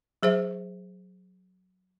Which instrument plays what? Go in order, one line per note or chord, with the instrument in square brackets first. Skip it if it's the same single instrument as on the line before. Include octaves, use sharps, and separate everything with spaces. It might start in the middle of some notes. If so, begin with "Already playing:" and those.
[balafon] F#3 G#4 C5 E5